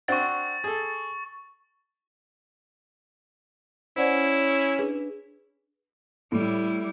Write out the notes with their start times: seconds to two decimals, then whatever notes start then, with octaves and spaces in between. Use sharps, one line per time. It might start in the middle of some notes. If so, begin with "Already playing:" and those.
0.08 C4 D4 F#4 C#6 A6
0.64 G#4 A4
3.96 C#4 E4 C5 D5 F#5
4.78 D4 G#4 B4
6.32 A2 G3 E4